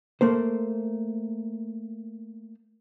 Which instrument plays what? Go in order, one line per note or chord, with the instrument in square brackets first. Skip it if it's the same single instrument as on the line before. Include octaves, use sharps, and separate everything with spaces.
[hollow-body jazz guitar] A3 A#3 C5